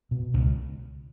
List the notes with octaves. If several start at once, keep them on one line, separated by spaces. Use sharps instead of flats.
B2
C#2